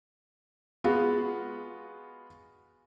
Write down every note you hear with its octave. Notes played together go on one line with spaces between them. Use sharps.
G#3 B3 F4 F#4